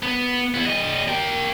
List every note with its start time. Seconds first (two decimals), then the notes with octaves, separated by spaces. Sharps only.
0.03 B3
0.54 B3 E4
0.66 G3 D#5
1.08 A#3 G5